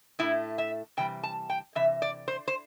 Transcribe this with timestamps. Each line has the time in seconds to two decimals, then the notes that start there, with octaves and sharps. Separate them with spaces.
0.19 A2 A3 E4
0.58 E5
0.97 C3 E3 G3 G5
1.23 A5
1.50 G5
1.75 C3 E3 E5
2.02 D5
2.28 C5
2.48 C5